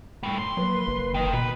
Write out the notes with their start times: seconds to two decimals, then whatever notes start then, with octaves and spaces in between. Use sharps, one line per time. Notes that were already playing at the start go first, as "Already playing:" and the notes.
0.23 G3 A3
0.38 C6
0.57 F#3 A#3 B4
0.88 F#1
1.14 D#3 D#5
1.33 B2 B4